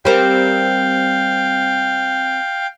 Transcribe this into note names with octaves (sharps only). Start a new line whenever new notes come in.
G3 C4 A#4 F5 G5